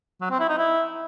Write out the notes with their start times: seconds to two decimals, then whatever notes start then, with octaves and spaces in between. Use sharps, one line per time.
0.21 F#3
0.31 C4
0.40 E4
0.49 D#4
0.58 E4